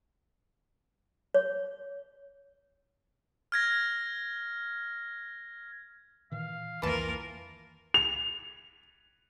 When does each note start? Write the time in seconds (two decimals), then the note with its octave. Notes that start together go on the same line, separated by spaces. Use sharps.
1.34 C#5
3.52 F6 G#6 A#6
6.32 A#2 D#3 E3 F5
6.82 C2 F2 D#3 E3 A#3 F4 A#4 A5
7.94 F7